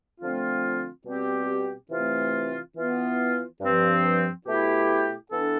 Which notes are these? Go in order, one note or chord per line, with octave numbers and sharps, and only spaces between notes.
D3 F3 A3 C4 F4
B2 G3 C4 G4
C3 E3 A3 C4 F4
E3 B3 F4
G2 F3 C4
B2 A3 E4 G4
E3 B3 D4 A4